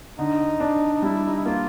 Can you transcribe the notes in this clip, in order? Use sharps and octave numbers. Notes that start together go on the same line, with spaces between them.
D3 D#4
D4
D#4
G3 E4
D#4
E4
A#3 F4